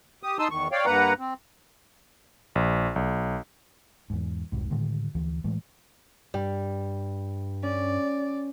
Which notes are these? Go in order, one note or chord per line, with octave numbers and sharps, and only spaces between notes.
G4 D#6
D#4 A5 C6 D#6 E6
E2 D#3 C#6
C#5 D5 F5 G5
G2 A#3 B4 F#5 A#5
C4
A#1
B1
E2 G#2
F1 C2 G#2
A2 D3 D#3 G#3
D2 E3 F3
A2 E3 G#3 A3
G2 G3
C#4 D5